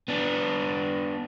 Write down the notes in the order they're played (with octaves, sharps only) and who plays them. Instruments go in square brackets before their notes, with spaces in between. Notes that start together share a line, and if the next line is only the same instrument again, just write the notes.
[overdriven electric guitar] B3 D4